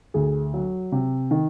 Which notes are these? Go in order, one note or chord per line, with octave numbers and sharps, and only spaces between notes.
D2 G#4
F#3
C3
D#3